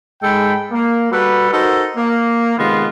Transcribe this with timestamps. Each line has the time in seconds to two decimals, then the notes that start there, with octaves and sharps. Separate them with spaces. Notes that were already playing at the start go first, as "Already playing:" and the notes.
0.23 G#2 G#3 A4 G5 B5
0.72 A#3
1.12 G3 F#4 A4 B4
1.52 D#4 F#4 A4 A#4 C5
1.96 A#3
2.58 C3 D#3 G#3 B3 F4